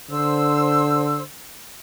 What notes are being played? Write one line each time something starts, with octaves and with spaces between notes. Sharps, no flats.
D3 C5 E6